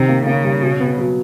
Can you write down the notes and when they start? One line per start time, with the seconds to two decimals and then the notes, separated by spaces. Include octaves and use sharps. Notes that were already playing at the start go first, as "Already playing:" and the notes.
Already playing: C3 D#3
0.09 A#3
0.26 C#3 A#3
0.44 G3
0.62 B2
0.80 B3
0.98 F#3